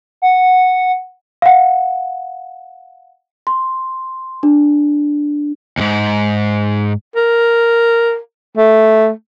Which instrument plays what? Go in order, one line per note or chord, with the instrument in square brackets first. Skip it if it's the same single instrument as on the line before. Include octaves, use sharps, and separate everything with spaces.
[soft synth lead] F#5
[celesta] F5 F#5
C6
D4
[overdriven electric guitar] D#2 G#2
[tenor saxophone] A#4
A3